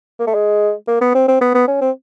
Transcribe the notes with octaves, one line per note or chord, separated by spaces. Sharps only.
A#3
A3
G#3
A#3
B3
C4
C4
B3
B3
C#4
C4